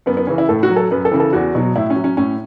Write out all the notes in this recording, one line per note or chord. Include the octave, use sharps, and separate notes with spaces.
F#2 B3
B3
C#3 E3 C#4
E4
A2 A4
F#4
F#3
A4
F#2 B4
A4
C#3 E3
A4
E2 F#4
B2 F#3
A2 E4
C#4
F#3
C#4
A2 C#4